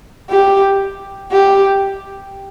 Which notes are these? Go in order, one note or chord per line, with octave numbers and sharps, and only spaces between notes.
G4
G4